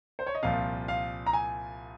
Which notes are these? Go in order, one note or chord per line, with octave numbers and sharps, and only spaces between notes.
C5
C#5
D#5
C2 A#2 F3 F5
F5
A#5
G#5